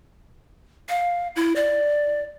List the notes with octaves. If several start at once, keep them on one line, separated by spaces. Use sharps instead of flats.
F5
E4
D5